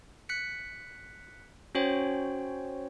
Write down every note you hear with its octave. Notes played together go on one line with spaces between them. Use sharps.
F#6 B6 C#7
C#4 F#4 C5 C#5 G5